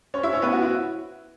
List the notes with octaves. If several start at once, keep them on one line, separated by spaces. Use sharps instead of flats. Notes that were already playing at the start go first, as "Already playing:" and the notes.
C#4 C#5
E4 E5
C#4 C#5
B3 B4
F#4
E4